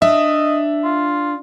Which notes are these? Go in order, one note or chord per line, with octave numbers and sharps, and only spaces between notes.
D4 D#5 E5
F4